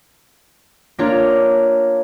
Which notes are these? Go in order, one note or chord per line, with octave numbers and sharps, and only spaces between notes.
A#3 D4 F4 C#5 D5 A#5